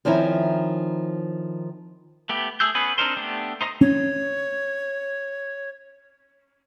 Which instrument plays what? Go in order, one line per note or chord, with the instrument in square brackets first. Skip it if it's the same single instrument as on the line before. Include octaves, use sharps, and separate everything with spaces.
[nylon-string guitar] D#3 F3 C4 C#4 D#4 E4
[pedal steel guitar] A3 B3 G4
A3 G#4 E6 G6
B3 C#4 G#4 B4
C4 D4 D#4 A#4 C5
A3 B3 D4 G4
D#4 C5 D#5 A#5 D#6
[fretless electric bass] C#4 [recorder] C#5